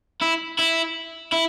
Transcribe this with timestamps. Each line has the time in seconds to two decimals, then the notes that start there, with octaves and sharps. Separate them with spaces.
0.22 E4
0.59 E4
1.32 E4